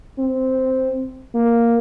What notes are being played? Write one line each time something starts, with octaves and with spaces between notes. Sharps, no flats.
C4
A#3